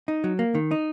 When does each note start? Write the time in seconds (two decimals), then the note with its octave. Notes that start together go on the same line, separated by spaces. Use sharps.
0.08 D#4
0.24 F#3
0.39 A#3
0.55 D#3
0.71 D#4